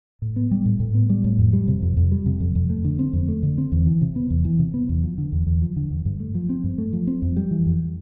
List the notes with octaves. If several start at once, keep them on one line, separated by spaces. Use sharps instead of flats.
A2
B3
G3
A2
A2
B3
G3
A2
F2
G3
C3
F2
F2
G3
C3
F2
F2
A3
D3
C4
F2
A3
D3
C4
E2
E3
C3
B3
E2
E3
C3
B3
E2
F3
D3
E2
E2
F3
D3
E2
G2
A3
F3
C4
G2
A3
F3
C4
F2
G3
E3
F2